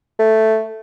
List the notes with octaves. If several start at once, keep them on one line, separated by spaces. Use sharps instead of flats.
A3